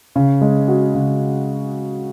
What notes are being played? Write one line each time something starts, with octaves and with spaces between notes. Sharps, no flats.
C#3
G#3
F#4
C#3